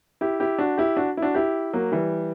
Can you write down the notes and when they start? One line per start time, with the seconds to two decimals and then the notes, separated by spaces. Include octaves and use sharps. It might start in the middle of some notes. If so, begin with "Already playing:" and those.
0.21 E4 G4
0.40 E4 G4
0.58 D4 F#4
0.78 E4 G4
0.97 D4 F#4
1.17 E4
1.22 D4 F#4
1.35 E4 G4
1.73 F#3 A#3
1.92 E3 G3